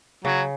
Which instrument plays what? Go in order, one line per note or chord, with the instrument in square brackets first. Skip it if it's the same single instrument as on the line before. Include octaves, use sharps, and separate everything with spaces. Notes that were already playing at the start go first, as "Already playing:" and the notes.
[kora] C#3 [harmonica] F#3